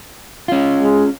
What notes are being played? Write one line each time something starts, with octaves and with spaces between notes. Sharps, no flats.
C#4 F4
G#3